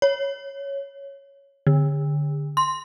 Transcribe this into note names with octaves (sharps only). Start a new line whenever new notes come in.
C#5
D3
C6